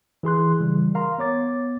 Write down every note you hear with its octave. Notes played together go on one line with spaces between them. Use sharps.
E3 G#4 C6 F#6
C#3 E3 G3
A#4 F5 A#5 C6
B3 C#5 D6 A6